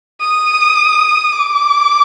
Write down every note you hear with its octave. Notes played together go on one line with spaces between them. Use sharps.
D#6
D6